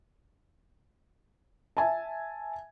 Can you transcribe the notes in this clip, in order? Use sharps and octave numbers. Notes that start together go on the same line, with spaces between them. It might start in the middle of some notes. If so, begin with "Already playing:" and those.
E5 G#5 A5